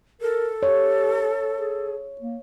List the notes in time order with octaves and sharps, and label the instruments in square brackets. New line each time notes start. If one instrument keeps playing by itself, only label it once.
[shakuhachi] A4 [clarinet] A#4
[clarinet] G4 [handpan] C#5
[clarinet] G#4
A#3